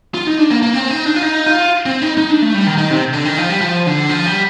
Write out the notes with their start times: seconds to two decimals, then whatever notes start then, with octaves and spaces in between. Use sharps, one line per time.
0.14 F4
0.27 D#4
0.39 D4
0.51 A#3
0.63 A#3
0.74 C4
0.91 D#4
1.06 D4
1.16 F4
1.22 D#4
1.46 F4
1.86 C4
2.02 D#4
2.18 D#4
2.30 D4
2.42 A3
2.54 G3
2.67 D#3
2.78 D#3
2.91 C3
3.14 D3
3.25 D#3
3.38 F3
3.50 G3
3.61 F3
3.87 D3
4.09 F3
4.26 G3